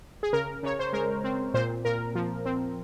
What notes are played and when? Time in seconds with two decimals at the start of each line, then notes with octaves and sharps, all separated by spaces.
0.23 G#4
0.33 C#3 A#4
0.63 C#3 C#5
0.79 C5
0.93 G#3 A#4
1.24 C4
1.54 A#2 C5
1.85 A#2 A#4
2.15 F3
2.45 C4